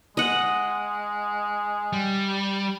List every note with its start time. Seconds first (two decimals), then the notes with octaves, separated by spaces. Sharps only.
0.17 G#3 D#5 F#5
1.93 G3